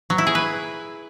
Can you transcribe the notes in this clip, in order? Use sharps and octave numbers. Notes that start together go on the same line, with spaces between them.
F#3
E4
G#4
B4